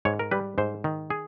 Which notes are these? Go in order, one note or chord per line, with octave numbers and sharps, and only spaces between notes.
G#2 C#5
A#4
G3 B4
G#2 C5
D#3
G#4